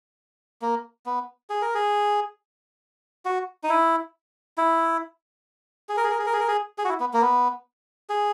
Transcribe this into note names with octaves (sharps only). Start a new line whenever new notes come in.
A#3
B3
G#4
A#4
G#4
F#4
D#4
E4
E4
G#4
A#4
G#4
A#4
G#4
A#4
G#4
A#4
G#4
G#4
F#4
E4
B3
A#3
B3
G#4